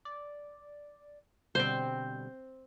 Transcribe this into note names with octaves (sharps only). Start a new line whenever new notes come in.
D5
B2 D3 G3 C4 C5